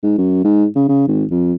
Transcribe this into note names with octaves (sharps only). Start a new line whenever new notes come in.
G#2
F#2
G#2
C#3
C#3
G#1
F2